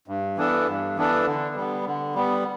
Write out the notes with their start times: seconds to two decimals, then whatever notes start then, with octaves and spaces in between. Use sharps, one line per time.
0.08 G2
0.37 E3 B3 D4 A4
0.67 G2
0.97 E3 B3 D4 A4
1.26 D3
1.55 G3 B3
1.85 D3
2.15 G3 B3